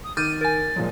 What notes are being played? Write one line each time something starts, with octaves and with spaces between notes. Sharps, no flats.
D#6
D#3 D6 F6 G6 A6 D#7
A#4 G#5 A6
A#2 F3 F#3 G#3